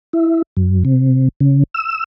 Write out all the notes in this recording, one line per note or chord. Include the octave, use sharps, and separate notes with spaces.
E4
F#2
C3
C#3
E6